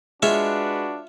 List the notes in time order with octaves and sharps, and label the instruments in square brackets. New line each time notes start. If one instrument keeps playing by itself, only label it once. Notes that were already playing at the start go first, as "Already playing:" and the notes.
[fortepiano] G#3 [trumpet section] D4 F#4 B4 [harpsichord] F4 C#5 E5